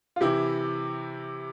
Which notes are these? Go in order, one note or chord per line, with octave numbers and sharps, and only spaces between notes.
F4
C3 E3 E4 G4